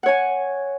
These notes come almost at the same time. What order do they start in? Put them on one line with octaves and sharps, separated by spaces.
F#5 C#5 G#5